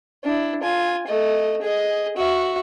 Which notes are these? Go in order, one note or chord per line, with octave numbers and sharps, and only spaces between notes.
D4 E4
F4 G#5
A3 D#5
G#4 D#5
F#4 E5